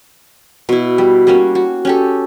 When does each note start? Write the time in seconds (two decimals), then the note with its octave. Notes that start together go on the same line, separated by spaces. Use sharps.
0.69 B2 E4
0.98 G3
1.27 G3 A#3 C#4 F#4
1.55 F#4
1.85 C#4 G4 A4